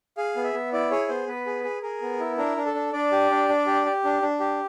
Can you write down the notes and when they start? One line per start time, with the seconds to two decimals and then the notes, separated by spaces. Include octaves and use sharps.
0.17 G#4 F5
0.36 B3
0.44 E5
0.53 B3
0.73 E4 D5
0.91 G#4 C#5
1.09 B3 C5
1.28 B3 B4
1.46 G#4
1.64 G#4
1.82 G#4 A#4
2.02 B3
2.20 E4
2.38 D4 A#4
2.57 D4
2.66 A4
2.74 D4
2.93 D4 D5
3.12 G4
3.31 D4
3.49 D4
3.66 G4
3.85 G4
4.04 D4
4.22 D4
4.40 G4